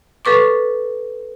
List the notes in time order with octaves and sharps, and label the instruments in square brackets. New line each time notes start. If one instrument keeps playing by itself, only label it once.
[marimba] A4 B4 C#6 D6